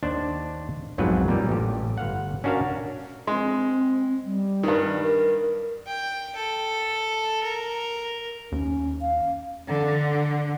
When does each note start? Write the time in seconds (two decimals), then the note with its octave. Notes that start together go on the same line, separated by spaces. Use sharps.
0.03 D#2 D4 C5 A5
0.98 B1 F2 G#2 F#3 B4
1.28 A#2 G3
1.49 A1 G4
1.98 G1 F5 F#5
2.44 C#4 D4 F#4 A#4 F5
3.27 G#3 C4
4.25 G3
4.63 G2 D#3
5.01 A#4
5.87 G5
6.36 A4
7.43 A#4
8.52 D#2 C#4
9.01 F5
9.69 D3